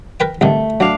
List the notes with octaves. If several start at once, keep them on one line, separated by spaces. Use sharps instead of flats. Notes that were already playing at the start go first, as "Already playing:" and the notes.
A#4 B4 G5
C2 D3 D#3 A3
F#3 D4 F5